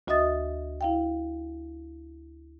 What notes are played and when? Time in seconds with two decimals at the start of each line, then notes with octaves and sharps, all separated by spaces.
0.07 D2 F#4 D#5 E5 D#6 A6
0.81 E4 F5 G5